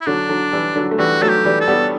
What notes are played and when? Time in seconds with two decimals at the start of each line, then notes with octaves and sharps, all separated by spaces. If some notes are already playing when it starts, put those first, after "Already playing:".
0.01 E4
0.06 D3 F#3 D4
0.29 D3 F#3
0.52 E3 G3
0.76 D3 F#3
0.91 A3
0.98 E3 G3 F#4
1.22 F#3 A3 A4
1.29 G4
1.45 E3 G3
1.61 A4
1.68 G3 B3